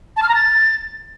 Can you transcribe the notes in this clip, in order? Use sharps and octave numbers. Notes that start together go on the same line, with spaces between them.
A5
F6
A#5
A6